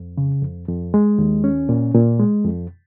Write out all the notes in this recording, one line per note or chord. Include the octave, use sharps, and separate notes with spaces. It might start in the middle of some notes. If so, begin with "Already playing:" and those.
Already playing: F2
C#3
F2
F2
G#3
D#2
C#4
A#2
A#2
G#3
F2